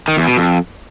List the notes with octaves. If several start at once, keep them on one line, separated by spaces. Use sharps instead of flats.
D#3
E2
B2
F2